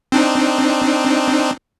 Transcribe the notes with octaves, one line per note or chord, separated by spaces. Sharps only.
C4 D4 D#4